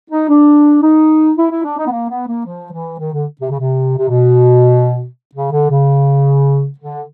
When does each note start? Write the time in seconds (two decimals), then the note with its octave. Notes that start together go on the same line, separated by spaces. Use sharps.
0.11 D#4
0.29 D4
0.83 D#4
1.37 E4
1.50 E4
1.64 D4
1.78 D#4
1.87 B3
1.91 A#3
2.09 B3
2.27 A#3
2.45 F3
2.72 E3
2.99 D#3
3.13 D3
3.40 C3
3.51 C#3
3.60 C3
3.98 C3
4.08 B2
5.35 C#3
5.52 D3
5.70 C#3
6.79 D3